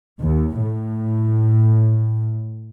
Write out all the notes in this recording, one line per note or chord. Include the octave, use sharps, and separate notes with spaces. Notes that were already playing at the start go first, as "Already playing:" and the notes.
D#2
A2